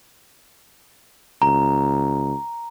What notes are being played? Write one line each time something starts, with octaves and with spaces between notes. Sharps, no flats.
C#2 A#5